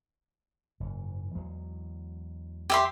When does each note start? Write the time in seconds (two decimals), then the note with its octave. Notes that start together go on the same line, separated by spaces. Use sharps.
0.80 F#1 G#2
1.35 E2 F#3 G#3
2.70 G4 E5 C6